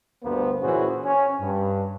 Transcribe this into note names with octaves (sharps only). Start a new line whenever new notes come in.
D2 G2 A#3 B3 C5
A#2 E3 C#4 F#4 G#4 C5
C#4
G2